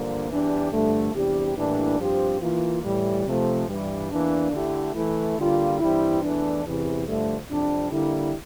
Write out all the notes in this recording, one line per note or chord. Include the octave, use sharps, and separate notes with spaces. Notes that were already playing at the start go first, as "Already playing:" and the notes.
Already playing: G2 D3 F3 A#3 D4
E2 E3 G3 D4 G4
G2 D3 F3 A3
E2 C3 G3 D4 G4
A2 E3 G3 A#3 D4
G2 F3 C4 G4
E3 A#3 F4
A2 E3 G3
C3 F3 A3
G2 E3 G3
E2 E3 A#3 D4
D3 A3 E4 G4
E3 A3 E4
D3 G3 A#3 F4
G2 E3 G3 C4 E4
E2 E3 A3 D4
E2 C3 E3
G2 D3 F3 A3
F2 C3 G3 D4
D3 G3 A#3 E4